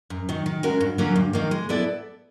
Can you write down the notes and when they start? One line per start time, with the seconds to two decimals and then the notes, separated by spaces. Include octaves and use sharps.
0.10 F#2
0.29 D#3 F#3
0.46 D#3
0.63 G#3 C#4 F#4 A#4
0.80 G2
0.98 D3 F#3 A#3 C#4
1.16 G2
1.33 D#3 F#3 A#3
1.51 G#3
1.69 B3 E4 A4 D5